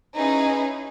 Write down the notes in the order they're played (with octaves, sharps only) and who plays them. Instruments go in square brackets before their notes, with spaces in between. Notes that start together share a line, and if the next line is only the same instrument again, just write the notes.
[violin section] C#4 D#4 E4 G#4 B4